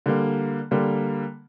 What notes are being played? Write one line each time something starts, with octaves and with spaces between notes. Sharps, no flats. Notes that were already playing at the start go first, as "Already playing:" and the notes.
D3 G3 A#3
D3 G3 A#3